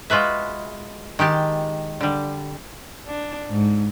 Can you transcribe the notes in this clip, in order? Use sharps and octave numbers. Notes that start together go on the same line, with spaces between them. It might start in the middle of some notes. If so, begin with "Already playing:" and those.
G#3 F4 F#4 B4 E5
D#3 G#3 G4 A5
D3 G3
D4
G#2